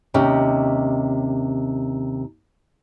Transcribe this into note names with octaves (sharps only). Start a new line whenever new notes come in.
D#2 C3 C#4 D#4